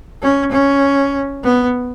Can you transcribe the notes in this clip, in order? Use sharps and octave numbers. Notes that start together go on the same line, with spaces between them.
C#4
C#4
B3